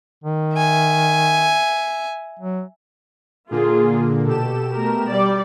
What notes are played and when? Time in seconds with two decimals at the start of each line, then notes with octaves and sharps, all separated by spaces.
0.24 D#3
0.57 E5 G#5
2.40 F#3
3.51 A#2 D3 A#3 F4 G#4
4.26 B2 G4 A4 E7
4.74 A3 A#4
5.09 G3 D5